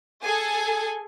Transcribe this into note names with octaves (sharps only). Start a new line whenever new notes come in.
G#4 A4 G#5